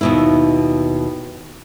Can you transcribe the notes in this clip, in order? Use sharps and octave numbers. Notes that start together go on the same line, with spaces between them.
D#2 B2 E4